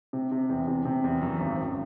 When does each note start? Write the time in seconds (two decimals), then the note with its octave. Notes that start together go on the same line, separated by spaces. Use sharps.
0.13 C3
0.32 C3
0.49 E2
0.68 C3
0.85 C3
1.04 E2
1.21 F#2
1.40 G#1
1.58 G#1